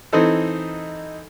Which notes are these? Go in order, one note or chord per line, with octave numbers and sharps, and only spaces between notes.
E3 C4 D#4 A4